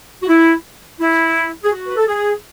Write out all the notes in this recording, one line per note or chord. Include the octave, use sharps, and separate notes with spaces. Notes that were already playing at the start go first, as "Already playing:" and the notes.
F#4
E4
E4
G#4
F#4
B4
A4
G#4